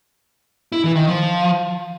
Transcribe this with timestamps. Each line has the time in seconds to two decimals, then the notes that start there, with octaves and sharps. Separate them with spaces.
0.72 E4
0.84 E3
0.95 D#3
1.07 F3